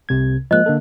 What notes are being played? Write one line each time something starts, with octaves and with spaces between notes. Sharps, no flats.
C2 C3 G#6
F3 G#3 A#3 D#5 F#6
D3 A#3 A4